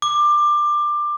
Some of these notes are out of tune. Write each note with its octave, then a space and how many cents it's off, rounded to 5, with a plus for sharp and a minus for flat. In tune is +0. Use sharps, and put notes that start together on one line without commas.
D6 +20